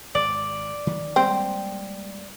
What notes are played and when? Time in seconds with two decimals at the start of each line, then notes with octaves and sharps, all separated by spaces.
0.15 G#1 D5
0.87 D#3
1.16 G3 G#3 A#3 C4